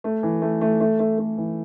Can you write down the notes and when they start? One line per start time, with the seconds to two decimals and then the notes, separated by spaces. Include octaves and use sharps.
0.04 A3
0.23 E3
0.42 A3
0.61 A3
0.80 A3
0.99 A3
1.18 A3
1.38 E3